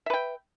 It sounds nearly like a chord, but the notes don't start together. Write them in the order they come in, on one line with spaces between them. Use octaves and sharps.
E5 B4 G5